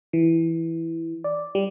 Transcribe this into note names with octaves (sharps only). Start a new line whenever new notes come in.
E3
D5
G3